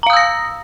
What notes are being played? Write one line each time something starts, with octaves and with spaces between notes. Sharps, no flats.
F5 A#5 D#6 E6 A#6